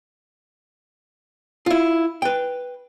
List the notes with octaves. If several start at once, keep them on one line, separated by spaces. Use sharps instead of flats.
E4 F4
B4 G5